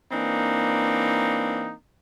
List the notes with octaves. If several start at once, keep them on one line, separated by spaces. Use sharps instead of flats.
E3 A#3 C4 D4 D#4